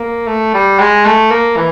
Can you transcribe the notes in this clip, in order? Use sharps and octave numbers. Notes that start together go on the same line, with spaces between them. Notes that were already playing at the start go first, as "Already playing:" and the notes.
Already playing: A#3
A3
G3
G#3
A3
A#3
E3